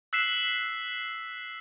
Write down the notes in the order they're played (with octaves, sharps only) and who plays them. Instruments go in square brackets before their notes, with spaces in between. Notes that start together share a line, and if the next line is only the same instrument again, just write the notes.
[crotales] E6 F#6 B6 C7 E7